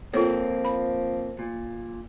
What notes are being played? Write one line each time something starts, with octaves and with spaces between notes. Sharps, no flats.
F3 A#3 C4 F4 A4 C#5
B5
A#2